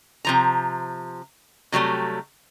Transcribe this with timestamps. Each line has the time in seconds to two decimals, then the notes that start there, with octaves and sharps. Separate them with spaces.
0.25 C3 F3 A#5
1.72 C3 F#3 G3 A3